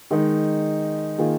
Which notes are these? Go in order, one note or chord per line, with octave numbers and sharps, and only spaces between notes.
D#3 G#3 D#4
D#3 A#3 F4 G#4